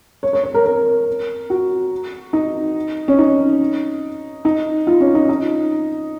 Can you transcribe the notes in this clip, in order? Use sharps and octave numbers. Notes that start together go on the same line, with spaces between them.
C#5
C#5
C#5
A#4
A#4
F#4
D#4
C#4
D#4
D#4
F4
C#4
D#4
D#4